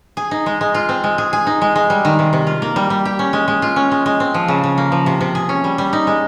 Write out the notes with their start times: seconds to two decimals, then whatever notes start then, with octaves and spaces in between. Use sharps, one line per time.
0.17 G#4
0.31 D#4
0.46 G#3
0.61 G#3
0.74 F4
0.89 C4
1.04 G#3
1.18 G#4
1.33 G#4
1.47 D#4
1.62 G#3
1.76 G#3
1.90 G3
2.05 D#3
2.19 C3
2.33 C3
2.47 F4
2.62 A#3
2.76 G3
2.90 G3
3.05 G4
3.19 C#4
3.33 G#3
3.48 G#3
3.62 F4
3.76 C#4
3.92 G#3
4.06 G#3
4.20 C4
4.34 F3
4.48 C#3
4.64 C#3
4.78 A#3
4.92 F3
5.06 C3
5.21 C3
5.35 G#4
5.49 C#4
5.64 G3
5.78 G3
5.93 D#4
6.07 G#3